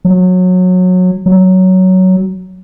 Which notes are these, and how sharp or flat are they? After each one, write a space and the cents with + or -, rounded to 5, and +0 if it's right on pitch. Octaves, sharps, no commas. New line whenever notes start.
F#3 -20
F#3 +10